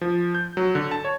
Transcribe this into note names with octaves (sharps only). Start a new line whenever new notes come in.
F3
G6
F#3
D3
A5
C#5